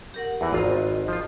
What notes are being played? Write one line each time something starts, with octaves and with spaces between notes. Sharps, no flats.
G4 A#4 F#5
E2 E3
G#1 F4 C5 D#5 A#5
F3 F4